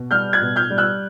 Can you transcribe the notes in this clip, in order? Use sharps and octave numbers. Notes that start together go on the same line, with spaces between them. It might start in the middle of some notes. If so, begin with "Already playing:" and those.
Already playing: B2
G3 F6 G6
F#6 G#6
B2
F6 G6
G3
E6 F#6